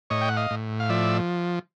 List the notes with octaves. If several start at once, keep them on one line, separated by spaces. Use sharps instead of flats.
A2 C#5 D#5
G5
F#5
D#5 F5
A2
F5
F3 D5 E5